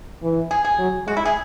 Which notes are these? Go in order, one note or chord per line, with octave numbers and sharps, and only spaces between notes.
E3
G#4
G#4
F#3
G#3 F#4
E4
G#4